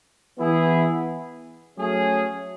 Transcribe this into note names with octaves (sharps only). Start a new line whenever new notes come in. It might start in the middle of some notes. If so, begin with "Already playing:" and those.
E3 B3 E4 G#4
F#3 A3 C#4 G#4